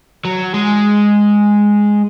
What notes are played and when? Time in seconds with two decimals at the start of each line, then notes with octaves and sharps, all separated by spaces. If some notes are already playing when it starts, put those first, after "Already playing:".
0.25 F#3
0.54 G#3